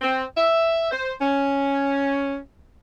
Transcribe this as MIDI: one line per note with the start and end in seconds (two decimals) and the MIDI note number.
0.01 0.24 60
0.37 0.89 76
0.92 1.14 72
1.20 2.38 61